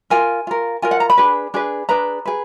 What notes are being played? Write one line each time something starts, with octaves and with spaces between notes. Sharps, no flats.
F4 A#4 G#5
F4 A#4
F4 A#4 G#5
F#5
A#5
B5
D4 G#4 B4
D4 G#4 B4
D4 G#4 B4 A#5
G#4 B4